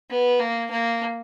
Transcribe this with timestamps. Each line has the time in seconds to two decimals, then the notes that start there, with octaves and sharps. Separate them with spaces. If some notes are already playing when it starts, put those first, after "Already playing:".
0.10 B3
0.40 A#3
0.71 A#3